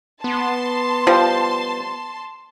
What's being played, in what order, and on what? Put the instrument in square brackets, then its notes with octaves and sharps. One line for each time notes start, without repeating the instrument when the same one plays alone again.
[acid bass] B3 [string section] A5 C6
[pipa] F3 G3 C5